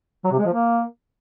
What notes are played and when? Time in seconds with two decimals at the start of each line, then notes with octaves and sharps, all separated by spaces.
0.25 F#3
0.32 C3
0.39 G#3
0.46 F3
0.53 A#3